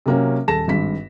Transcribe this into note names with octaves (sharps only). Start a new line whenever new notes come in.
C3 F#3 A#3 C4 C#4
D#1 A4 A5 A#6 E7
G#1 G2 B6